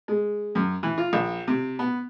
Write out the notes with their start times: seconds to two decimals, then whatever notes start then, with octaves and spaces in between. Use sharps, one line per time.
0.08 G#3
0.55 F#2
0.83 E3
0.98 F4
1.13 A#1
1.48 C3
1.79 B3